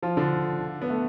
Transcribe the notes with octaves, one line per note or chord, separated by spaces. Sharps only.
F3 F4
D3 D4
B3
A3